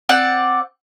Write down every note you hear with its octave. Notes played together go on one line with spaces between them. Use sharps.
C4 D5 F#5